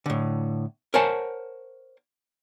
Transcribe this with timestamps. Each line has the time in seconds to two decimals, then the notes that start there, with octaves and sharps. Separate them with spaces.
0.06 A2 D3
0.94 A#4 C5 C#5 F#5 G#5 A5